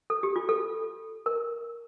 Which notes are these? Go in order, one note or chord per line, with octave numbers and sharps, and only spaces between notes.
A4
G4
F4
A4
A#4